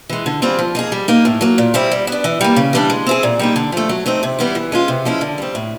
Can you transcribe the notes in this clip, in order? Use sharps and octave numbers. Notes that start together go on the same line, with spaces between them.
E3 G#3
D3
G3 C4 F4 G#4
F3
A#3 D#4 G#4
G3
A#3 D#4
A2
F#3 A#3
A#2
G3 C4 E4
G3
B3 D4
E3
G3 A#3
C#3
E3 G3 B3 D4
G#3
C4 E4 G#4
A#2
G3 A#3 D#4
D3
F3 A3
F#3
A3 C4 D#4
C3
E3 G3 B3 E4
E3
G#3 C#4 F4
C3
F3 G#3 C#4 E4
D3
G3 C4
A2